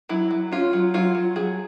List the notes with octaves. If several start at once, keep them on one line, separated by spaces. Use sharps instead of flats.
F#3 E4
F#3
C#4 F4
F#3
F#3 F4
F#3
F#3 G#4